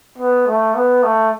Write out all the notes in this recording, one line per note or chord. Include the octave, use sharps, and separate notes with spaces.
B3
A3
B3
A3